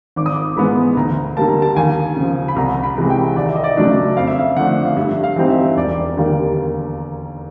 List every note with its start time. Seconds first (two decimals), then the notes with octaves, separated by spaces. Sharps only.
0.16 G#1 D6
0.26 D#6
0.36 D6
0.56 G#2 E3 G#3 B3 B5
0.97 D2 A#5
1.37 D3 G3 A#3 A5
1.49 A#5
1.62 A5
1.76 D#2 G#5
2.17 C#3 F3
2.48 B5
2.56 C2 A#5
2.72 A#5
2.83 B5
2.97 C3 E3 G#3
3.10 G5
3.36 D#2 D5
3.49 E5
3.56 D#5
3.64 D5
3.77 C#3 F#3 A3 D4
3.90 E5
4.17 F2 F5
4.27 E5
4.39 F5
4.56 D3 F3 A3 D4 F#5
4.86 F5
4.97 G2 E5
5.24 F5
5.36 E3 G3 C4 D#4
5.50 E5
5.76 E1 D5
6.17 D#2 D3 G3 A#3